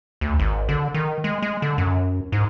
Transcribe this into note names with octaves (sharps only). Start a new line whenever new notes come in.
D2
G#1
D3
D#3
G#3
G#3
D3
F#2
G#2